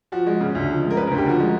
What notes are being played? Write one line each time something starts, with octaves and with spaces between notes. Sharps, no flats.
F3 F#4
G#3
C#3
D2
F3
G#3
A#4
C#3 B4
A#4
D2
G4
F3 F#4
G#3